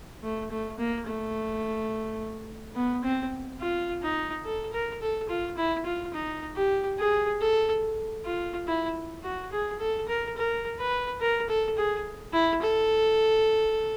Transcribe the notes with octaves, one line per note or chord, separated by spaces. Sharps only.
A3
A3
A#3
A3
B3
C4
F4
D#4
A4
A#4
A4
F4
E4
F4
D#4
G4
G#4
A4
F4
E4
F#4
G#4
A4
A#4
A#4
B4
A#4
A4
G#4
E4
A4